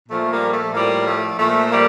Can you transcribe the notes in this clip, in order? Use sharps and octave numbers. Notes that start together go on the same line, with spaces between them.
A#2 F3 A3
G3 A#3
A3
A2 F3 G3 A#3
A3
A#2 F3 A3
G3 A#3